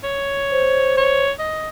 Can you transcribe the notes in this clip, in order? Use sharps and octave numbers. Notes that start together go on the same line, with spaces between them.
C#5
C5
C#5
D#5